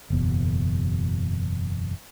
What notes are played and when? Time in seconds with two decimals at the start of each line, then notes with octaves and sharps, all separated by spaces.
0.10 F#1 E2 B2